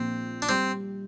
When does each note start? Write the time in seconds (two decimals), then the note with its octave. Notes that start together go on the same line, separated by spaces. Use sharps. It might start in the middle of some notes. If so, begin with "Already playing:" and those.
Already playing: A#1 A#2 F3 C4
0.42 D4
0.49 G3 C4